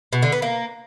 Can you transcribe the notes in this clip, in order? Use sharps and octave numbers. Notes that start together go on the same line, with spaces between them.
B2
D3
B3
A#3